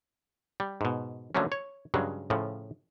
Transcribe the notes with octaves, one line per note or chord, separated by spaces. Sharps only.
G3
G#2 B2
D3 F3 F#3 A3 A#3 C#4
C#5
G2 C#3 F#3 G#3
A2 C#3 F3